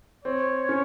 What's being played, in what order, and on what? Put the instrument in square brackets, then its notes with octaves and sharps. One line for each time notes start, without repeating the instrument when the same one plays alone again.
[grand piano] C4 [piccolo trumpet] C#5
[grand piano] C#4